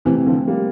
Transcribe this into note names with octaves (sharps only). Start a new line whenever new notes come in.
C3 E3 A3 C4 E4
D3 F3
G3 A#3